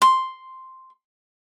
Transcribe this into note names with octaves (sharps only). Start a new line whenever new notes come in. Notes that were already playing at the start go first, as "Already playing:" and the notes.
C6